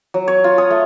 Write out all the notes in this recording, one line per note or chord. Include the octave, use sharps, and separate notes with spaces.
F#3
C#5
F4
D#6
A3